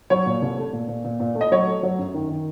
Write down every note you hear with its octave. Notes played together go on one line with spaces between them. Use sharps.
F#3 C#5
A#2
C2
A3
A#2
A#2
A#2
A#2
A3
D#5
F#3 C#5
A3
F#3
F#2
D#3
D#3